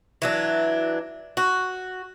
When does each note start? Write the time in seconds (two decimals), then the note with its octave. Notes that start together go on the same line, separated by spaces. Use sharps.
0.22 E3 F#3 D4
1.37 F#4